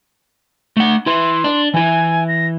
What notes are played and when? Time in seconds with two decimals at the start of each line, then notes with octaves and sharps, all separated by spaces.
0.77 A3 F#5
1.06 E4 B4 C6
1.44 D4
1.74 E3 E4 G#5
2.28 A#6